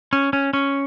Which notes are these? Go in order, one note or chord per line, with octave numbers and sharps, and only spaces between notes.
C#4
C#4
C#4